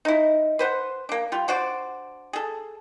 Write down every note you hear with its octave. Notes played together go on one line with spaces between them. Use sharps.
D#4 E4
B4 C5 F#5
A#3 D4
G3 F4
D4 F#4 C5 D5
G#4 A4